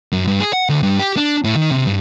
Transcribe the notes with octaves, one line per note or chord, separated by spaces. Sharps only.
F#2
G2
G#4
F#5
D2
G2
G4
D4
A2
D#3
C3
G2